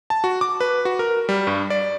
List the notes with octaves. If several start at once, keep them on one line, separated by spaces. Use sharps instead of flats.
A5
F#4
D6
B4
F#4
A#4
G3
G2
D5